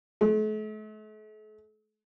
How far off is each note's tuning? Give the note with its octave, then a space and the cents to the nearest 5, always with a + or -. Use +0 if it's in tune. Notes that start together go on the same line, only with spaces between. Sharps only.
A3 -40